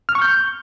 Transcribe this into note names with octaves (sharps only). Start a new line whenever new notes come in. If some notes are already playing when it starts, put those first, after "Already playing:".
F6
C#6
G6